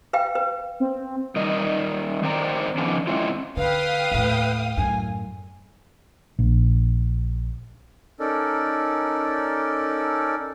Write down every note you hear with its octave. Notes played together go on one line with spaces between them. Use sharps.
B4 F5 G5
B4
C4
D#3 G3 D#5
D#3 C4 C5 D5 G5 A#5
D3 D#3 F3 B3 C#4 D4
G#3 C4 C#4 E4 F4
D3 B4 F5 G5 D#6
D#2 A2
F#2 A2 G#5
A#1
C#4 D#4 A4 A#4 D5